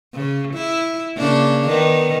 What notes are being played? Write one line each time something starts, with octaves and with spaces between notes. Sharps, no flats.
C#3
E4
C#3 A#3 D4
D#3 B3